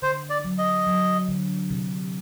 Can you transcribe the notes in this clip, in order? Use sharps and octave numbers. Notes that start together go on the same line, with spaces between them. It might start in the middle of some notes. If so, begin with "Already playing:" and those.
D3 C5
D5
F#3
D#5
F#3
D3
C3